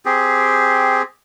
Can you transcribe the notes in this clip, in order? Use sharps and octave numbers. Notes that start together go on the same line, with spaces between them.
C4 G4 G#4